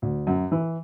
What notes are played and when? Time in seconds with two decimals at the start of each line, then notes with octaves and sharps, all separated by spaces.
0.02 D2
0.27 F#2
0.52 E3